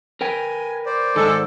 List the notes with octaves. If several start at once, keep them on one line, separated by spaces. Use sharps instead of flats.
A#4 B4 G5 G#5
C5 D5
G#2 D#3 G#3 A4